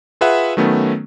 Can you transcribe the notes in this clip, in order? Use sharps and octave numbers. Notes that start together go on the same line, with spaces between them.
F4 G#4 B4 E5 F#5
D#3 F#3 A3 B3 C#4